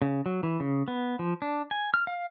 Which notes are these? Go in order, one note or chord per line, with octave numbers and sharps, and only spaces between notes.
C#3
F#3
E3
C#3
B3
F3
D4
G#5
F6
F5